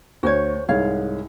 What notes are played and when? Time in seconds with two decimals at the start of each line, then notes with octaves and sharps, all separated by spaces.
0.23 D2 F#4 C5 C#5
0.69 C2 G#2 G#3 C#5 F5